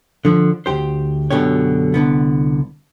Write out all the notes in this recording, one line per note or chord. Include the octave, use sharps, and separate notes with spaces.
D3 F3
D2 G2 G4 C5
F#2 B2 D3 G4 C#5
C2 D3 B3